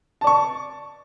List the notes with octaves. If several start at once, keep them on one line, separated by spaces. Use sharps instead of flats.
D5 A5 C#6